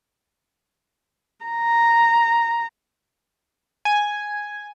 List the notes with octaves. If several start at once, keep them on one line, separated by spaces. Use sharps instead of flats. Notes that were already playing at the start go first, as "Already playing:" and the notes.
A#5
G#5